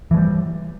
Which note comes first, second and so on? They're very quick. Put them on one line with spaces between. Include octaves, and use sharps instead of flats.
E3 G#3 G3